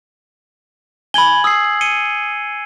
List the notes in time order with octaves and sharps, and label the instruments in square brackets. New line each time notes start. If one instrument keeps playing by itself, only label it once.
[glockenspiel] G#5 G#6 F#7 [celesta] B5 G7
[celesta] D#6 [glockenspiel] E6 C7
[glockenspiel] C#7 D#7 G7